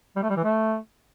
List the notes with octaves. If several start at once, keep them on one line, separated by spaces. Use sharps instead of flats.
G3
A3
G3
E3
A3